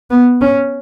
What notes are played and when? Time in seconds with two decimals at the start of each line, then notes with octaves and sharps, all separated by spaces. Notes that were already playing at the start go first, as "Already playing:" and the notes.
0.11 B3
0.41 C#4